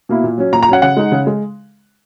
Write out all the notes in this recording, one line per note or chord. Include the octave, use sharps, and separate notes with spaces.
B2 A#3 E4
A#2
F#3 C#4
A#2 A#5
A#5
F#3 C#4 F#5
C#3 F#5
G#3 D#4
C#3
G#3